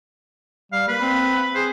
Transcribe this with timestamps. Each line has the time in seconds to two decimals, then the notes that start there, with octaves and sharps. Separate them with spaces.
0.72 G3 F5
0.88 A#3 B4
1.01 C4
1.55 G#4 C5